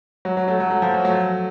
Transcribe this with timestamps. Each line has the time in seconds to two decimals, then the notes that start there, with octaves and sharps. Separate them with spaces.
0.25 F#3
0.37 F#3
0.48 F#3 A3
0.60 F#3
0.71 F#3
0.82 F3
0.94 F#3
1.05 F#3 A3